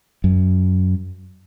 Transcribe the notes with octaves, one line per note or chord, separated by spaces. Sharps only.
F#2